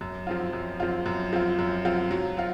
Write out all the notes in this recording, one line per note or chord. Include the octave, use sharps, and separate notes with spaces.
F#2
F3 C4 F4
F#2
F3 C4 F4
F#2
F3 C4 F4
F#2
F3 C4 F4
F#3
C4 F4